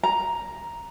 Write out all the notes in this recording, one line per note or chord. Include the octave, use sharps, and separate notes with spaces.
A#5